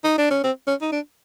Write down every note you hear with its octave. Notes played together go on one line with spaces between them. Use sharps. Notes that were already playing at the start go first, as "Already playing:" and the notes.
D#4
D4
C#4
C4
C#4
D#4
D4